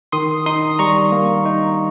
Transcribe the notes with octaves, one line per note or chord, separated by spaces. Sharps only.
D#3 C6 D#6
D#4 C6 D#6
G3 A#5 C#6
A#3
D#4